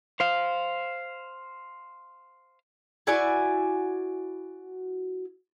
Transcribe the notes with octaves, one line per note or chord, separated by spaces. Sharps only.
C5 F5
E4 F#4 D5 G#5